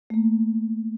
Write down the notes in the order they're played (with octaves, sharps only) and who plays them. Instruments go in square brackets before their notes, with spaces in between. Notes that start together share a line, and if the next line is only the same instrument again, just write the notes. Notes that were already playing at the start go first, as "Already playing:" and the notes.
[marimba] A3 A#3